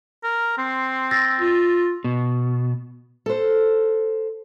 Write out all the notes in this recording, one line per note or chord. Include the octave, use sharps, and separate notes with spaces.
A#4
C4 C6
E6 A6 A#6
F4
B2
A4 C5